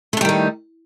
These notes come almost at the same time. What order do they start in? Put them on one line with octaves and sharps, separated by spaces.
A3 D4 G3 D#3 D#4